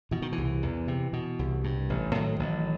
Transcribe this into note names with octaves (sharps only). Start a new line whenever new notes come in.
B2 E3
D#3
E3
C2
E2
C3
B2
C2
G2
A1
A2 D#3 F#3
A1